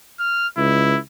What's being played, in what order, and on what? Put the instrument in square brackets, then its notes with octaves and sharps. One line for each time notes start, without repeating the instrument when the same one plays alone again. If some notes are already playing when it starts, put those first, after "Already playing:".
[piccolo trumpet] F6
[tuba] C#2 [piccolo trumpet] E4